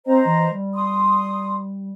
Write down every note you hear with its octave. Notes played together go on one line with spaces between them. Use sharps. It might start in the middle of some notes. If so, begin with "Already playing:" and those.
C4 C5 D#5 A#5
E3
G3
C6 D#6